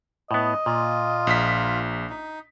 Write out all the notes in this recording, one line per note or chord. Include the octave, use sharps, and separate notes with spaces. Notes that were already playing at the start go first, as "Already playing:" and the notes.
A2 B3 D#5
A#2 F4
A#1 B6
D#4